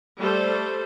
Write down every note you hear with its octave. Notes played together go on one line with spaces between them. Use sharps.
G3 A3 A4 C5